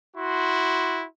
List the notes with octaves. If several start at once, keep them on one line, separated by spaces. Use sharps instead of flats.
E4 F#4 C6